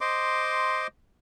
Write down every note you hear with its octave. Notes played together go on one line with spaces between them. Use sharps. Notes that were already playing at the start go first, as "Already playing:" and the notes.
C5 D#5 C6 D6